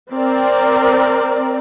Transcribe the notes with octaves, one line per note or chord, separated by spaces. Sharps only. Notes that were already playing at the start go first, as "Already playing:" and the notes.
C4 A#4 D5